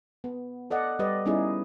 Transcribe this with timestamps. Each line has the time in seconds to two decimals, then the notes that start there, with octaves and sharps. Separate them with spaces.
0.24 B3
0.70 A4 D5 D#5 F#5
0.99 G3 G4 B4 D5 D#5
1.26 G3 B3 C#4 D#4 E4 G#4